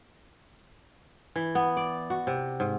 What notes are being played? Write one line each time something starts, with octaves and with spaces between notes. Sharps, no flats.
E3
B3
D5
F#4
C3
G#2